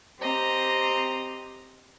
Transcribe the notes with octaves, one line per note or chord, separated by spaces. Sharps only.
C4 G4 D#5 A#5